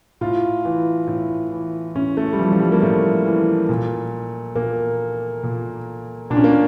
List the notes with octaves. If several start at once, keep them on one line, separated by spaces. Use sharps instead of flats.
A2 F4
E3
A2
E3
A2 C#4
A3
G3
E3 F3
F3
G3
A#3
A2 A3
E3
A#2
A#2 A#3
A#2
A#2 D4
C#4
A#3
C#4